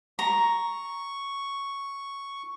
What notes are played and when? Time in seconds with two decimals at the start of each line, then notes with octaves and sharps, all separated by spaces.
0.19 A#5 C#6